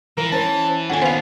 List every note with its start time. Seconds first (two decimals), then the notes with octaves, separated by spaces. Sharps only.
0.17 E3 F3 A#4
0.32 C#4 C5 A5
0.90 D#2 C#4 D4 F4 A4 F#5 G#5
1.02 B3 C5 F5